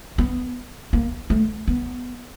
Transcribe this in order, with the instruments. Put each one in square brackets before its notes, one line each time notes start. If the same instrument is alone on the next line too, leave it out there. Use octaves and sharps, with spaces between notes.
[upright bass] B3
A#3
A3
B3